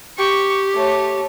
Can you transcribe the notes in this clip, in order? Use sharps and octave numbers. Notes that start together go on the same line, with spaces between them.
G4 C#6
A3 C#5